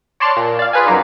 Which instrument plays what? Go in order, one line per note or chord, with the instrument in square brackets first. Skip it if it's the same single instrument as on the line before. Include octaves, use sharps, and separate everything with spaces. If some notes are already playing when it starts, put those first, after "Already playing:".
[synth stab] C#5 D5 A5 C6 F6 F#6
A#2
D5 F5
F4 G#4 B4 F5 G#5
F#2 F#3 A#3 D#4